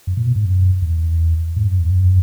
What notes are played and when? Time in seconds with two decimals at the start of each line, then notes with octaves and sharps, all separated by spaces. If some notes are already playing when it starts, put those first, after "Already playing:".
0.07 F#2
0.17 A#2
0.26 B2
0.36 G#2
0.45 F#2
0.82 E2
1.56 G#2
1.68 F#2
1.79 E2
1.90 F#2